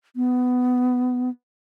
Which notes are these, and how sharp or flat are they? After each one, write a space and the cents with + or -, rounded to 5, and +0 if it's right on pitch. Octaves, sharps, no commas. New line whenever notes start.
B3 +15